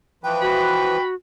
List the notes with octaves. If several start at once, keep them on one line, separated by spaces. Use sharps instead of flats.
E3 F3 B4 G5
F#4 B5